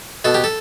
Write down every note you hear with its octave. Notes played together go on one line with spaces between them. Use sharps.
B2 A4
G4
A4